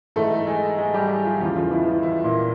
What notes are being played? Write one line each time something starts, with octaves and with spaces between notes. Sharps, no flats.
G#2 E3 A3 A4
G#3 G#4
G#3 G#4
G3 G4
F3 F4
E2 C#3 E3 F3 F4
F3 F4
E3 E4
F3 F4
E3 E4
A#2 A#3